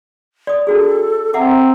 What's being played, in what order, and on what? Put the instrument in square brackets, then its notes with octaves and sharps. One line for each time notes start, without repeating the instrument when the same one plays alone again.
[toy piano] D5 D#6
[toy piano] D4 F#4 G#4 [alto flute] A4
[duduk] C4 [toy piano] E5 F#5 D6 [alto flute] A#5